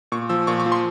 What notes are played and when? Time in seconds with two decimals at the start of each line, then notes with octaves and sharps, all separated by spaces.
0.12 A#2 C#6
0.29 F3 E6
0.47 A#2 C#6
0.60 C#6
0.66 F3
0.72 C6